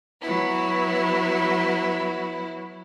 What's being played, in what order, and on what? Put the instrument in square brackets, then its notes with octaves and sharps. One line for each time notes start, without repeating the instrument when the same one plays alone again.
[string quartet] F#3 B3 E4